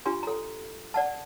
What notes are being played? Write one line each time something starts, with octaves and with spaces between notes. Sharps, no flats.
D4 F4 G4 G#5 C6
A4 A#5
D5 F#5 A5